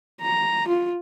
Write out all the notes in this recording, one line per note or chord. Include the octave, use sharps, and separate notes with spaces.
A#5
F4